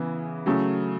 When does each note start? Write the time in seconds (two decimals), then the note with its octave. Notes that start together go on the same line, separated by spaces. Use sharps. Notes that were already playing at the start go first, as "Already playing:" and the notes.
Already playing: C#3 E3 B3 E4
0.46 C#3 F#3 A3